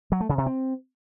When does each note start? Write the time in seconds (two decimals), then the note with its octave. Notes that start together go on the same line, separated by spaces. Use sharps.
0.12 F#3
0.20 A3
0.29 C#3
0.38 C3
0.46 C4